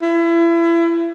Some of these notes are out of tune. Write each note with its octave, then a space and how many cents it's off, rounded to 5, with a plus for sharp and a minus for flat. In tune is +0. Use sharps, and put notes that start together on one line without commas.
E4 +30